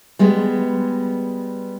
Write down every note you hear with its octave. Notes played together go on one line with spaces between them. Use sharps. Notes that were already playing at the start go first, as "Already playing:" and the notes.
G3 G#3 B3